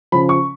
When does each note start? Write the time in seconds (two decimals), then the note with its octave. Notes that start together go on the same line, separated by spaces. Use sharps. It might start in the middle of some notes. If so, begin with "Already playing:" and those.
0.12 C#3 F3 B5
0.29 C#6